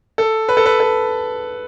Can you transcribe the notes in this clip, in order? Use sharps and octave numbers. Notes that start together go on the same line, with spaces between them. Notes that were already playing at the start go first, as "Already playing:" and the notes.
A4
B4
A4
B4
A4